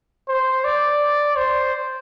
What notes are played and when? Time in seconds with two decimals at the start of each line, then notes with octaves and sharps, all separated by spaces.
0.28 C5
0.64 D5
1.36 C5